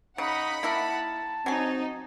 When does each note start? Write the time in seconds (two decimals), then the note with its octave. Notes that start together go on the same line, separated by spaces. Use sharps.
0.18 C#3 D#4 F#5 B5
0.63 A#3 E4 A#4 A5
1.46 F#3 C4 D#4 G#5